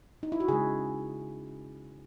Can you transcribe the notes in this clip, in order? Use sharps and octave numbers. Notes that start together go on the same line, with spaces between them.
D#4
E4
F#4
C#3 G#3 G#4